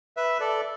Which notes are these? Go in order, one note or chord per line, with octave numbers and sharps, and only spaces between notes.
B4 E5
A4 D5